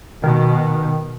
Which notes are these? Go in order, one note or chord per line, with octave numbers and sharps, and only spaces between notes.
B2 D#3